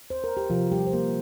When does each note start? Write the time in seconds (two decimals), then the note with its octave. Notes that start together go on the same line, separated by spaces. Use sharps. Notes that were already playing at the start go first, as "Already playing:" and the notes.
0.10 C5
0.24 A#4
0.37 G4
0.50 C3 F3 F4
0.72 G3 G4
0.83 F3 C5
0.93 A#3 A#4